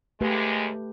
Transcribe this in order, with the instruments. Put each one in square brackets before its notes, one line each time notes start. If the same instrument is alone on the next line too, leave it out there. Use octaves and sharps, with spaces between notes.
[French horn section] D#2 G#3 [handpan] A3 G4 B4